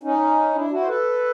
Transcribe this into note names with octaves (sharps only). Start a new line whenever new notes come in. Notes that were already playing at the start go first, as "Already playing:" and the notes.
C#4 D#4
D4 E4
E4 F#4
C5
A4 B4